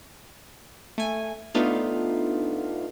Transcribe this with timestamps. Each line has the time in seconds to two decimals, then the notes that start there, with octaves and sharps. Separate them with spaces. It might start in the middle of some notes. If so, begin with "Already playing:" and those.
0.98 A3 G#5
1.54 A3 B3 D4 D#4 F4 F5